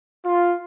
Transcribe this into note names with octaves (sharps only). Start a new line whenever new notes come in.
F4